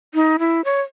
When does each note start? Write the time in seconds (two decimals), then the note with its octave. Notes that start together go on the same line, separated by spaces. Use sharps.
0.14 D#4
0.39 E4
0.65 C#5